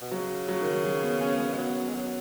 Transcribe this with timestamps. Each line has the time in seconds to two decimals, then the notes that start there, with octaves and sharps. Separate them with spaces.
0.01 B2
0.12 C#3 F#3
0.48 F#3
0.60 D#3
0.73 F#3
0.85 F#3
1.03 B3
1.21 C#4
1.40 B3
1.53 G#3
1.58 F#3
1.89 G#3
1.95 F#3